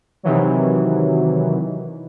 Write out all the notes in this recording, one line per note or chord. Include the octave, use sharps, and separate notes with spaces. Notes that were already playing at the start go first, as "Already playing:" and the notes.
C3 D#3 E3 F#3